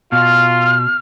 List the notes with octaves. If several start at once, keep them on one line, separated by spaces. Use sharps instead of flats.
B2 F4 F6